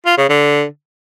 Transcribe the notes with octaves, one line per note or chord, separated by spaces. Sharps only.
F4
C#3
D3